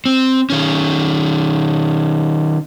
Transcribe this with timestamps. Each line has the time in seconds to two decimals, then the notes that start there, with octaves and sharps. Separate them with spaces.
0.06 C4
0.50 D#3 C#4